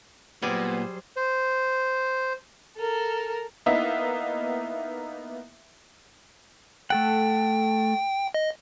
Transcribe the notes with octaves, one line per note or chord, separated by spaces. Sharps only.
A#2 F#3 G3 B3 G#4 C5
C5
A4 A#4
A#3 B3 D#4 E4 E5 F5
A3 A4 F#5 G5
D#5